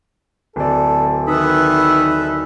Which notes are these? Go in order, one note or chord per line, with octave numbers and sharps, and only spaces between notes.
D1 A4 D5
D#3 D#4 A4 B4 E5 B5 D#6